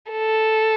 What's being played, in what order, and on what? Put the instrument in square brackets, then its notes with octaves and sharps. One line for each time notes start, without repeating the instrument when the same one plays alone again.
[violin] A4